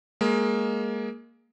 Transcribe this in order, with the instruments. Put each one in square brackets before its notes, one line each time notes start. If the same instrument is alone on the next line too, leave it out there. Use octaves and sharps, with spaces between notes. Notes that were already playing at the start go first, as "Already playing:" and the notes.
[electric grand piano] G#3 A#3